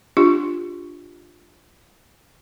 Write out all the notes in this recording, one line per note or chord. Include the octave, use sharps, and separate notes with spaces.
D4 F4 G4